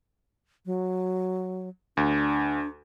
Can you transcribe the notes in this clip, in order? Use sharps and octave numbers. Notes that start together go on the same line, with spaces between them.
F#3
D2 D4